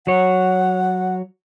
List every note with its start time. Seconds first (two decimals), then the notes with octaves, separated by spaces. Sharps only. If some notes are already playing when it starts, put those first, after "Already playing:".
0.07 F#3 C#5 F#5